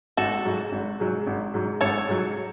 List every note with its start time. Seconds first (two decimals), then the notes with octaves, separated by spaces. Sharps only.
0.17 G#1 F#4 A4
0.45 G#2 F#3
0.72 G#1
1.00 G#2 F#3
1.27 G#1
1.54 G#2 F#3
1.81 G#1 A4 C#5
2.08 G#2 F#3